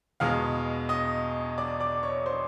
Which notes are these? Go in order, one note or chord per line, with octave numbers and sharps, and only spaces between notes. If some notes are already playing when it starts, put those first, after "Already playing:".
E2 B2 G#3 F5 F6
D#5 D#6
D5 D6
D5 D6
C#5 C#6
C5 C6